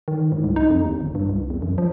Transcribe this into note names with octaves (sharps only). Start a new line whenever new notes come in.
D#3
G#2
C2
D#4
F2
D#2
G1
G2
C2
E2
F#2
F3